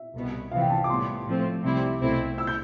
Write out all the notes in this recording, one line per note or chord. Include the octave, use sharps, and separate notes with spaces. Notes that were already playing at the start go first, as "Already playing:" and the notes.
Already playing: E5
C2 B2 B3
C2 C3 E3 B3 F5
G5
A5
D6
A2 G3 B3 C6
A2 F3 A3 C4
C2 C3 G3 C4 E4
C2 B2 A3 C4 E4
E6
G6